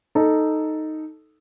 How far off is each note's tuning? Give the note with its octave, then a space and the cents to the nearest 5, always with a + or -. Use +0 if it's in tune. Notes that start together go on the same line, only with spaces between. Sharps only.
D#4 +0 A4 +0